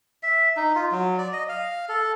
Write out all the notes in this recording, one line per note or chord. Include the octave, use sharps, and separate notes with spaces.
E5
D#4
F4
F#3
D5
D#5
F5
A4